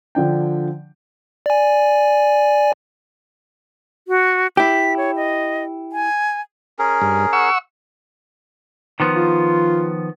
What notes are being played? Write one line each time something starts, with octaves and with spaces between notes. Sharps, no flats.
D3 F3 D4 G5
D5 G#5
F#4
E4 G4 B6
C#5
D#5
G#5
C#4 G#4 A#4
G2
F#5 C#6 E6
D#3 F3 B3
F4